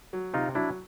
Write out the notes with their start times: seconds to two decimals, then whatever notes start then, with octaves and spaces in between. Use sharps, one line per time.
0.13 F#3
0.34 C3 D#4 F4
0.55 F#3 D4 E4